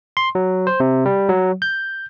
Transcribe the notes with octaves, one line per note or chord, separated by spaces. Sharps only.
C6
F#3
C5
C3
G3
F#3
G6